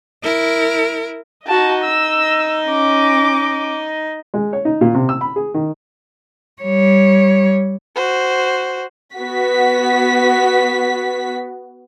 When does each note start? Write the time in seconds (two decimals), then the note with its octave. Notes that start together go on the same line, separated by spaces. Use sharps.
0.23 E4 A#4
1.47 D#4 F#4 D#5 A5
1.84 E6
2.68 C#4 D6
4.34 G#3
4.53 C#5
4.65 D#4
4.81 A#2
4.94 C3
5.09 E6
5.21 B5
5.36 G#4
5.54 D#3
6.62 G3 C#5
7.96 F#4 C5
9.15 B3 F#4 B6